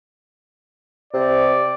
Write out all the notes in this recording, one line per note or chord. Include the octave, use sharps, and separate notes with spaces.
C3 D5